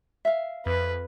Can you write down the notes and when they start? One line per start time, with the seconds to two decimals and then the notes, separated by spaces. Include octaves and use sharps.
0.25 E5 F5
0.66 F2 B4